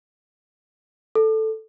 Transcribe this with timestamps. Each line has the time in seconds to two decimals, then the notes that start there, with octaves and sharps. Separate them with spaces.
1.15 A4